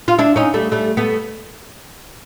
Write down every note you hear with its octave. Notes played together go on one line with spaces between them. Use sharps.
F4
D4 E4
C#4 D#4
G3 A3
G3 A3
A3 B3